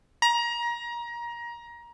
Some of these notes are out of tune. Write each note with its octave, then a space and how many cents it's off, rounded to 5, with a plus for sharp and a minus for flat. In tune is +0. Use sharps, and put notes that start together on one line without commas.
A#5 +25